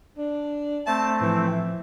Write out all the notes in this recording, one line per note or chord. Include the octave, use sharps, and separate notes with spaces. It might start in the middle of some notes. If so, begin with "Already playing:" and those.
D4
A3 C4 A5
A2 E3 F3